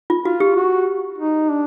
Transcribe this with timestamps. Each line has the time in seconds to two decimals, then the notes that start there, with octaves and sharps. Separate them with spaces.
0.10 F4
0.25 F4 F#4
0.40 G4
0.56 F#4
1.18 D#4
1.49 D4